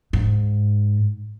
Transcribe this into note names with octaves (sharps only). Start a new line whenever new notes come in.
G#2